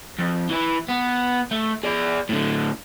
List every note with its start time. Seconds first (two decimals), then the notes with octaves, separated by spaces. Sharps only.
0.19 F2
0.50 E3 E4
0.89 B3
1.51 A3
1.83 G#4 D5
2.29 A2 D3